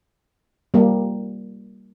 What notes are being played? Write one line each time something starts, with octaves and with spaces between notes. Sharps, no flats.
G3 A#3